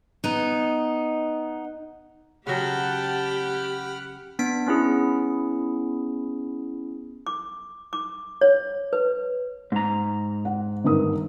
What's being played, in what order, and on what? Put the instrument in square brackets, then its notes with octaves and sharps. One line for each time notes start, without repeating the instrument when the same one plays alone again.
[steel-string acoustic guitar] B3 D#4
[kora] C#3 F#3 [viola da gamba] G4 [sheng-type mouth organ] F#5 B5 F6 [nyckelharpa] G5 A5
[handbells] B3 D4 B6 D7
B3 C#4 E4 G#4
[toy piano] D6
D6
C#5
B4
[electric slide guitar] G#2 A#5
[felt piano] F#5
G1 D#3 D#6